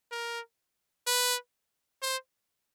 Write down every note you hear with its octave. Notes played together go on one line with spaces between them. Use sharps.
A#4
B4
C5